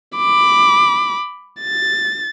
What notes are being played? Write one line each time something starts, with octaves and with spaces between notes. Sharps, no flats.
B5 D6
A6